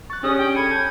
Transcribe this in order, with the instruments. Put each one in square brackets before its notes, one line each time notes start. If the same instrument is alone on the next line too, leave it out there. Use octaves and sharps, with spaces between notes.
[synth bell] C#6 F#6 [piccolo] A6
[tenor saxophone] C#4 [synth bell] D4 G4 G#4 [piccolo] D#6
[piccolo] G5
[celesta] A4 B5 C#7 [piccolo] G#6 [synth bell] D#7
[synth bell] A5 [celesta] G6